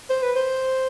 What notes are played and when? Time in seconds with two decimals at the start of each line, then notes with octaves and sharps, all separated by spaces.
0.10 C5
0.22 B4
0.36 C5